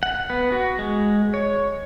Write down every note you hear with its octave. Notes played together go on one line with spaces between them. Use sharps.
F#5
B3
F#4
G#3
C#5